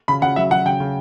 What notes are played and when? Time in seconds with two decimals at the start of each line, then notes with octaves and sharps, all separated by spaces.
0.08 C#3 B5
0.22 C#3 F#5
0.36 F#3 E5
0.51 F#3 F#5
0.65 C#3 G5
0.80 C#3